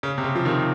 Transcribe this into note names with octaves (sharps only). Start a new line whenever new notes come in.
C#3
C3
C#3
F3
C3 D#3